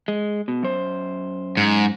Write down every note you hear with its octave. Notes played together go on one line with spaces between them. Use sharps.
G#3
B2
F#2 C5
G#2